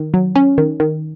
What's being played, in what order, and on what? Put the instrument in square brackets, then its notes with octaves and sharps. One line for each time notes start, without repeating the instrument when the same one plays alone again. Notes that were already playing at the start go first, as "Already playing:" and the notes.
Already playing: [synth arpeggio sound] D#3
F#3
C#4
D#3
D#3